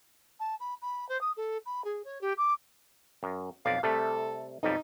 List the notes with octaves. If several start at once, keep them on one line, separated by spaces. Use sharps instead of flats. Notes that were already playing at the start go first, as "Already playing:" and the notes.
A5
B5
B5
C5
D#6
A4
B5
G#4
C#5
G4
D6
F#2
B1 F2 D5 F5
C3 G3 A3 A4
B1 F2 G3 D#4